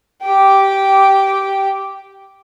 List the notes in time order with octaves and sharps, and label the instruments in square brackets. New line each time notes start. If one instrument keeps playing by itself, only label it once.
[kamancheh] G4 G5